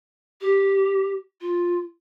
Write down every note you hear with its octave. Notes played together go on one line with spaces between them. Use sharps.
G4
F4